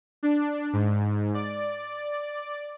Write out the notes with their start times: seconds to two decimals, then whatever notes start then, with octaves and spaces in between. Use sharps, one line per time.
0.23 D4
0.73 G#2
1.34 D5